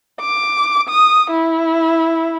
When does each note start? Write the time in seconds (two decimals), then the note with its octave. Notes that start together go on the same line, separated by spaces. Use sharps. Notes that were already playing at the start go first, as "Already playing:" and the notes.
0.21 D6
0.89 D#6
1.30 E4